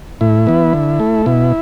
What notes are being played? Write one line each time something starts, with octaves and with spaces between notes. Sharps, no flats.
A2 E4
E3 B3
D3
A3
B2 E4